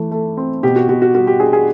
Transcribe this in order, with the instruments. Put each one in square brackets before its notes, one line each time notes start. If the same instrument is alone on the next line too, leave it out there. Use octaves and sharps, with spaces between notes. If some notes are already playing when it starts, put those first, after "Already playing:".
Already playing: [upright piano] E3 A3
A3
C4
B2 G4
F#4
B2 F#4
F#4
G3 F#4
G4
D4 G#4
G#4